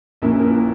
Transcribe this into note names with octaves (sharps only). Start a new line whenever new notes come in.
A#1 A#2 A#3 C#4 E4 A#4
A#4
B4